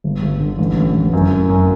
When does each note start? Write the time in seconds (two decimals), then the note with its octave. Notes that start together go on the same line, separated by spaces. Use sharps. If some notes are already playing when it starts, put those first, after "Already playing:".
0.04 G1
0.22 G1
0.40 D3
0.58 A1
0.76 A1
0.95 A1
1.13 F#2
1.32 F#3
1.50 F#2